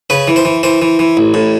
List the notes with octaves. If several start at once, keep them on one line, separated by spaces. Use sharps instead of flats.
C#3 B4
E3
C5
E3
E3 C5
E3
E3
A1
A2